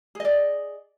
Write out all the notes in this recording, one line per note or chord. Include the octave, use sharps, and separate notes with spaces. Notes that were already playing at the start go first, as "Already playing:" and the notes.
G#4 D5 D#5